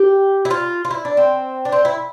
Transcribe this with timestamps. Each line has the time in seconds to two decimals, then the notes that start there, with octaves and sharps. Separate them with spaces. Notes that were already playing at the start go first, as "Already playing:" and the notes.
Already playing: G4
0.45 E4
0.51 F4
0.85 F4
0.91 E4
1.05 D4
1.17 C4
1.65 D4
1.72 C4
1.85 E4